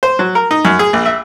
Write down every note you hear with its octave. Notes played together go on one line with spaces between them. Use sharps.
C5
F#3
A#4
D#4
F#2
G#4
A#1
E5